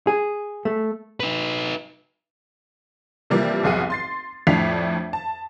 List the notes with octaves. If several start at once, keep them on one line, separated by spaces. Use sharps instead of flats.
G#4
A3
D#4 B4
C3 E3 F3 G3 A#3
F1 B1 G#4 F#5 D#7
C6 A6 C7
F2 A2 D4 B6 C7 F7
A5